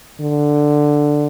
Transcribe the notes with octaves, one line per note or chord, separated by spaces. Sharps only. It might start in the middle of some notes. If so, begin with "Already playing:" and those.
D3